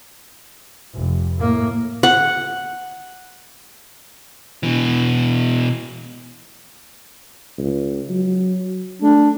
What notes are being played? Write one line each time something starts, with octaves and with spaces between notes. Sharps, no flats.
F1
A2 A#3
F#5
B2 E3
C#2
F#3
A3 D4